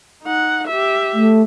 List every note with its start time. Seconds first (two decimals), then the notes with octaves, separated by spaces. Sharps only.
0.23 D#4 F#5
0.67 G4 E5
1.14 A3